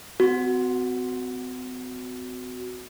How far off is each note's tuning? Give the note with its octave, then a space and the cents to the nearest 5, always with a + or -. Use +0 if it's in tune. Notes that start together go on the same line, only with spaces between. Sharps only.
C4 -45 F#4 +0